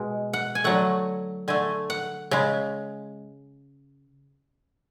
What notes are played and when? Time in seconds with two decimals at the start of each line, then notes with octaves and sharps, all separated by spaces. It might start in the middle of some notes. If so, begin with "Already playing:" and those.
Already playing: B2 G#3
0.33 F#5
0.55 G#5
0.64 D3 F#3 A3 F#5
1.48 D3 A3 G#5
1.90 F#5
2.31 C#3 G#3